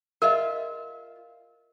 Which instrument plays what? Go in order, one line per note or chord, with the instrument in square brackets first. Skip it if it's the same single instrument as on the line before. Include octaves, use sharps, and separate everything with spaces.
[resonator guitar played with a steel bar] F4 E5 [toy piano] A#4 D#5